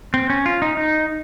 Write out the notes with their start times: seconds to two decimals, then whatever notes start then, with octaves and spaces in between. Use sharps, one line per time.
0.14 C4
0.30 C#4
0.46 F4
0.62 D#4
0.77 D#4